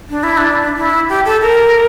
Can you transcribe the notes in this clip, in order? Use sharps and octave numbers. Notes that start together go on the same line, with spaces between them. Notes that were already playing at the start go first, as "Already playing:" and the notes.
D4
E4
D4
E4
G4
A4
A#4